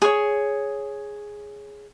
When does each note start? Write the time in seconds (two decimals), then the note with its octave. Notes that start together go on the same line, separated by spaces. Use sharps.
0.02 G#4 C#5